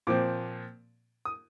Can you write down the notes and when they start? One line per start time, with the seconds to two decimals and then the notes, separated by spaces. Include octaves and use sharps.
0.07 A#2 F3 C4 D6
1.25 D#6